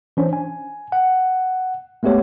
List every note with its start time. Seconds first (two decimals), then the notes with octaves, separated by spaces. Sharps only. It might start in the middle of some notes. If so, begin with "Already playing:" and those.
0.17 E3 C#4 D4 C5
0.33 G#5
0.92 F#5
2.03 G#3 A3 B3 G4 C#5